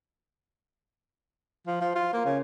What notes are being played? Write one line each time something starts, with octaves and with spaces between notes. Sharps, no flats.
F3
F3
F4
A#3
C#3